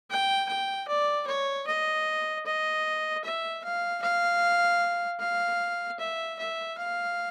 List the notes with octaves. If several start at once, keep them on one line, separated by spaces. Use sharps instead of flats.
G5
G5
D5
C#5
D#5
D#5
E5
F5
F5
F5
E5
E5
F5